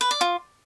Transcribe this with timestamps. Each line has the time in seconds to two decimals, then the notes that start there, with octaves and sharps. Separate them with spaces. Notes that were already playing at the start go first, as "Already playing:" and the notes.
0.01 B4
0.11 D5
0.21 F4